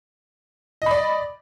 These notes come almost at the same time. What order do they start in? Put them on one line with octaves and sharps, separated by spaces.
D#5 B5 D5